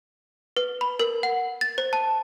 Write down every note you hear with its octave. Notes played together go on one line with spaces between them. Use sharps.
B4
B5
A#4
F#5
A6
C5
A5